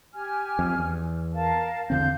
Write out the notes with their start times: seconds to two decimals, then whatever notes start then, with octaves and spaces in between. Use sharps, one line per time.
0.14 G4 G#5 F6
0.59 F2
0.79 E2
1.34 A#4 F5 A5
1.90 E2 D3 C4 F5 G6